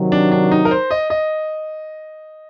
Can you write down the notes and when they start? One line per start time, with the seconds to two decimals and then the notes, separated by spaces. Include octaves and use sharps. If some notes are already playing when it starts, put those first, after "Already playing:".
Already playing: C3 D#3 F#3
0.12 D4
0.32 D4
0.52 D#4
0.65 A#4
0.71 C5
0.91 D#5
1.10 D#5